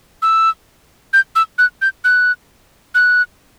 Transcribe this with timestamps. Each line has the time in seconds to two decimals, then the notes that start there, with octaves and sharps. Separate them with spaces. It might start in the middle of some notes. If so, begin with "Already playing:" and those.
0.22 E6
1.13 G6
1.36 E6
1.58 F#6
1.82 G6
2.04 F#6
2.95 F#6